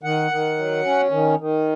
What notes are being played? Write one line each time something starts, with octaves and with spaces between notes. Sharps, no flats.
D#3 F#5
D#3
F#3
C#4
D#3
D#3